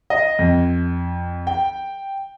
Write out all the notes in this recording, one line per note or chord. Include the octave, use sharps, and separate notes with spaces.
D#5
F2
G5